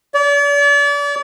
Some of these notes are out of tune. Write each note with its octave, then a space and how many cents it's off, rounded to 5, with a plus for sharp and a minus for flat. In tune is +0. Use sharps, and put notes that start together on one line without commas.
D5 -40